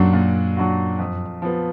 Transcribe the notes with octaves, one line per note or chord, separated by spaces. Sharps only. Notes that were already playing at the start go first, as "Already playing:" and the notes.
Already playing: F#2 A#2 F#3 D4 F#4
A#2
F#3 D4 F#4
F2
F3 B3